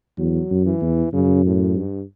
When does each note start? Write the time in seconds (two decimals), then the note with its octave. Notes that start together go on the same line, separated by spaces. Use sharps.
0.18 E2 F#3
0.51 F#2
0.66 E3
0.82 E2
1.13 F#2 C#3
1.45 A2
1.77 G2